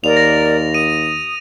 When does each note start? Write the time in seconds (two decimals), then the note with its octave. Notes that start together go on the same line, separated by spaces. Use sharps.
0.04 D#2 A#4 D5 F7
0.17 A#6
0.74 D#6 D#7